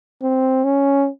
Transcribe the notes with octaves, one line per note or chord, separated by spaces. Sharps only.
C4
C#4